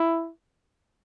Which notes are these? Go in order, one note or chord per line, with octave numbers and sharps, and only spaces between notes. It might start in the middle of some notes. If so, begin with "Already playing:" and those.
Already playing: E4